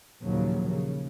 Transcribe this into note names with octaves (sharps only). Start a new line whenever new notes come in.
A#1 D#2 C#3 F3 F#3
C#3